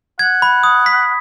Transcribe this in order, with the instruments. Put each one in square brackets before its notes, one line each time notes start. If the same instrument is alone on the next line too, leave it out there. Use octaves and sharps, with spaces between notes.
[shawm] F#5 [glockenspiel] G#6
[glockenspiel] B5
D#6
B6